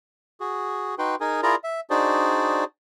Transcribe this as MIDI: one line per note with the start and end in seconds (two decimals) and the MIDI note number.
0.40 0.95 66
0.40 0.95 68
0.99 1.15 63
0.99 1.15 66
0.99 1.15 71
0.99 1.15 79
0.99 1.15 84
1.20 1.41 63
1.20 1.41 68
1.20 1.41 70
1.20 1.41 80
1.43 1.55 64
1.43 1.55 65
1.43 1.55 68
1.43 1.55 70
1.43 1.55 74
1.43 1.55 82
1.64 1.80 76
1.90 2.64 62
1.90 2.64 63
1.90 2.64 66
1.90 2.64 68
1.90 2.64 72
1.90 2.64 74